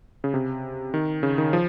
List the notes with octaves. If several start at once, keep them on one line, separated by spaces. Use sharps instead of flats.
C#3
C3
D#3
C#3
D#3
F3